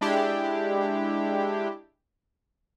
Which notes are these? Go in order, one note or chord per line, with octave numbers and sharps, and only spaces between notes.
G#3 D4 E4 G4